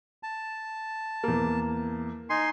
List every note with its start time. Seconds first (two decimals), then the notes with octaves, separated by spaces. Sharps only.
0.23 A5
1.24 E2 A#3
2.30 D#4 G#5 C6